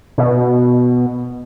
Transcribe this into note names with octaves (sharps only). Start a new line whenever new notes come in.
B2